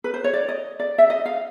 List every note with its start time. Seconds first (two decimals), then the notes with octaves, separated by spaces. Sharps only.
0.04 B4
0.14 C5
0.24 C#5
0.34 D5
0.48 D#5
0.80 D5
0.98 E5
1.10 D#5
1.26 F5